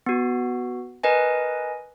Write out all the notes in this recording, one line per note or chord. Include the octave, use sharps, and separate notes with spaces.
B3 F#4
A#4 B4 D#5 G#5